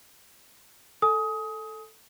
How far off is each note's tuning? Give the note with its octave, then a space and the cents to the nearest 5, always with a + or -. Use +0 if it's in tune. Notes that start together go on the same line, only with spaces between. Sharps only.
A4 +0 G#5 +25 D#6 +20